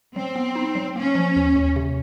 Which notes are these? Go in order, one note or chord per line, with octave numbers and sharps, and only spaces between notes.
F#3 C4
B3
D#4
F#3
A#3 C#4
F3
D#2
D#2
C3